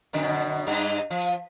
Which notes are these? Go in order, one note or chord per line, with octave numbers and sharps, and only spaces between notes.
F#2 B2 D3
G2 D#4
F3